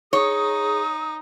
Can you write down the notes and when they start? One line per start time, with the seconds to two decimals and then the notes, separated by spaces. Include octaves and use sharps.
0.13 D#4 G#4 C#5 D#6